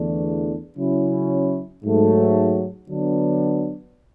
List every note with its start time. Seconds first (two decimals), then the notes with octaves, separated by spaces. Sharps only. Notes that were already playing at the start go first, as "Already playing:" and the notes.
Already playing: E2 D3 A3 D4
0.77 C#3 F#3 C#4 E4
1.83 G#2 F#3 A3
2.89 D3 F#3 B3 D4